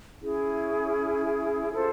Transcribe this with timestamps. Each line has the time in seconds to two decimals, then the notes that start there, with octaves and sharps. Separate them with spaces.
0.21 C#4 E4 G#4
1.73 F4 A4 C5